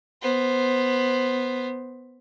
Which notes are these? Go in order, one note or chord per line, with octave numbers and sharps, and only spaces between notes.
B3 C5